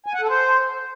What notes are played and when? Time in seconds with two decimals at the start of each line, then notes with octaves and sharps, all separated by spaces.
0.06 G#5
0.14 F#5
0.21 A4
0.28 C5